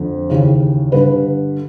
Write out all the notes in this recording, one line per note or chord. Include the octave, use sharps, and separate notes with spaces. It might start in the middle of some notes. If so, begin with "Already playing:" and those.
Already playing: F2 D3
D#2 C#3 E3
G2 D3 B4